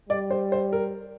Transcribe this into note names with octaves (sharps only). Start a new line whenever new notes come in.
G3 D5
C5
C5
A#4